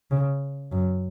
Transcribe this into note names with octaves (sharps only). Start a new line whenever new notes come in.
C#3
F#2